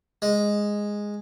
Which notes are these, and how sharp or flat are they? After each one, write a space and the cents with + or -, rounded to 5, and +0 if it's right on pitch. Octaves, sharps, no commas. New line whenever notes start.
G#3 -5